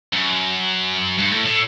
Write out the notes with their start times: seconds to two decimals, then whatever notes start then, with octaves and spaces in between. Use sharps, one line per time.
0.13 F#2
1.18 G2
1.31 A2
1.46 A2